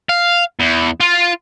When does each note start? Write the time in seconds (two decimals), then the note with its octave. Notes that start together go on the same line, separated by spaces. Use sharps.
0.09 F5
0.60 E2
1.01 F4